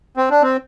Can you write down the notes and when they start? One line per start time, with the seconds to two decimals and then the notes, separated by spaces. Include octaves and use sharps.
0.17 C4
0.30 D4
0.42 C4